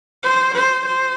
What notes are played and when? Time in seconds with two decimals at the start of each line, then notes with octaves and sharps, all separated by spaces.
0.23 C5
0.55 C5
0.86 C5